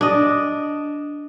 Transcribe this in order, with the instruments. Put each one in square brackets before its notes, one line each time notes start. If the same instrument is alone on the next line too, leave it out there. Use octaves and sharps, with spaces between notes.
[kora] D4 D#5